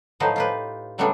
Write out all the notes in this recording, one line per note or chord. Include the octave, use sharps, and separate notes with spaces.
A2 F3 F#3 D#4 B4 C5
F4 G4 B4
C#3 F#3 G3 A3 B3 D4